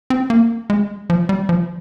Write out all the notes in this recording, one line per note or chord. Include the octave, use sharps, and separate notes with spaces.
C4
A#3
G#3
F3
G3
F3